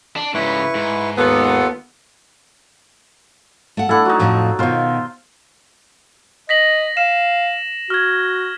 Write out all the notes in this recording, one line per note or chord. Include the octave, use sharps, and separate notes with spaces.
D4
G#2 C#3 E4 B4 C#6
G#2
D#2 B3 F4 A4
A3 F#5
A3 D4 E4 A4 F#5
F#3 D#4
F2 A2 F3
B2 D#3 F4 C5
D#5 A#6 B6 F#7
F5 E7
F#4 F6 G#6